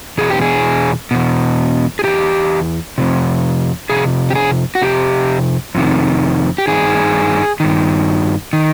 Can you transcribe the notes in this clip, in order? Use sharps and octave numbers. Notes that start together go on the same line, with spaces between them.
E2 B2 G#4
G4
G#4
E2 B2
G#4
E2 B2 G4
F2 C3
F2 C3 G#4
G4
G#4
F#4
F2 C3 G4
F2 C3 D#3
G4
G2 D#3 G#4
G2 D#3
D#3